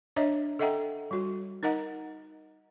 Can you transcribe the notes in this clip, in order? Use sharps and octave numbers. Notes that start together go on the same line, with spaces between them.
D4 C#5 D#5 E5 A#5
A4 D#5 E5 F#5 G5 A#5
G3 F#4
D#4 A#4 D#5 F#5 A#5